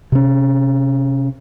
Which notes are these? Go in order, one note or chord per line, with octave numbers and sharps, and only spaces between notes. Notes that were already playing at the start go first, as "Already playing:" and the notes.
C3 C#4